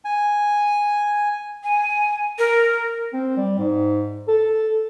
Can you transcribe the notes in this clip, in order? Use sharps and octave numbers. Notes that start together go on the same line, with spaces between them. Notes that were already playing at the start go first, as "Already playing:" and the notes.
G#5
G#5
A#4
C4
G3
G#2
A4